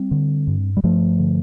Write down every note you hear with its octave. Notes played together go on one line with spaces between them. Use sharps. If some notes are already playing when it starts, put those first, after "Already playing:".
Already playing: G3 C4
D3
G2
G3
G2 F3 A3
D3